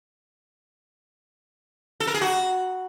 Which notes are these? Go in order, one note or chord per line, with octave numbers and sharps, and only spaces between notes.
A4
A#4
G#4
F#4